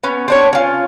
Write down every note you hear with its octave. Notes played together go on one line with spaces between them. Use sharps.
B3 C#4
C4 D4 C#5
C#4 F4